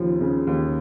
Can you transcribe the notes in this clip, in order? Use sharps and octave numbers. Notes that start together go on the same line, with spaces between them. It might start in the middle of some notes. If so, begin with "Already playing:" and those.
Already playing: D#2 C#3 F3
C#3
D#2